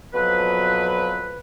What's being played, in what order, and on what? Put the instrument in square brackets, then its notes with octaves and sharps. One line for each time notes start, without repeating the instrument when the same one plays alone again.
[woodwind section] F2 B2 F3 F#3 B4